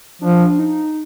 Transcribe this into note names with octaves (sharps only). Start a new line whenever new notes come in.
F3 D4
D#4